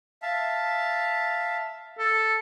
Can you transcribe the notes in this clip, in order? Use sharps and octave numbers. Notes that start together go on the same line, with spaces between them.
E5 F5 A5
A4